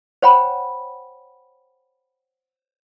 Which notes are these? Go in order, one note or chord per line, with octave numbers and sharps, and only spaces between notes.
C5 C#5 F#5 G5 B5